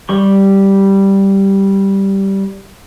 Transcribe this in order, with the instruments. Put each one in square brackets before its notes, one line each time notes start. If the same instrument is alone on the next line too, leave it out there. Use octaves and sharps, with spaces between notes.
[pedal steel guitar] G3 G4 C#6